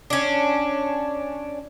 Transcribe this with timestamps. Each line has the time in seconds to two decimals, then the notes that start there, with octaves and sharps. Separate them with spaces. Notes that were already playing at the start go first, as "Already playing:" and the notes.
0.10 C#4 D4